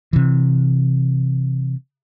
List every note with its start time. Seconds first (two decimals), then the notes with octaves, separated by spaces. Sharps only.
0.13 C3 E3